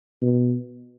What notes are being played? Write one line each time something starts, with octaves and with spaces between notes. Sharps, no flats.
B2